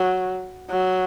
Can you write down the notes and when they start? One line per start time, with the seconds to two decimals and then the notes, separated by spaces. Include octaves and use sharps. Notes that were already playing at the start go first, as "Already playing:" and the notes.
Already playing: F#3
0.71 F#3